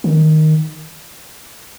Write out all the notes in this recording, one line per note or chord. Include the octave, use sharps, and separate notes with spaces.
D#3